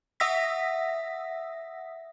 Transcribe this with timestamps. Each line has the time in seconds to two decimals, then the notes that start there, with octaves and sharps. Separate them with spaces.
0.20 E5 F#5 D#6 E6 A#6 B6